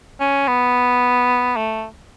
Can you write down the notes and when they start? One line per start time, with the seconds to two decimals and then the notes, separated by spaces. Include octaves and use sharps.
0.21 C#4
0.48 B3
1.57 A3